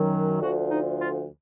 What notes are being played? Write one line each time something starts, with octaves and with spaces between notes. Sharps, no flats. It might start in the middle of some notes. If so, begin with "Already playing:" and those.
Already playing: F#2 D#3 F#3
D2 D3 F3 F#4
D#4
F4